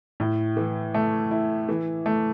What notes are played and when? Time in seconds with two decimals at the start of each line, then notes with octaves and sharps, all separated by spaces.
0.20 A2
0.57 E3
0.94 A3
1.31 E4
1.69 E3
2.06 A3